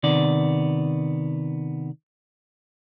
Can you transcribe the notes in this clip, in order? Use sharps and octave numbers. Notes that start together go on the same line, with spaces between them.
C3 D#3 B3 D5